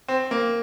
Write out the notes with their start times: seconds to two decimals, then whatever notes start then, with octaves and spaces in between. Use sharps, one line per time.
0.08 C4
0.31 A#3